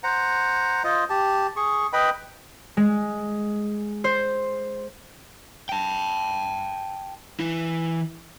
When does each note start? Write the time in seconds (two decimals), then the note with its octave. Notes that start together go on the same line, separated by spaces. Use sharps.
0.04 C5 F#5 A#5
0.84 F4 C5 D#5
1.10 G4 A5
1.56 G#4 C#6
1.93 B4 D#5 G5 B5
2.77 G#3
4.04 C5
5.69 G5 A5
7.40 E3 E4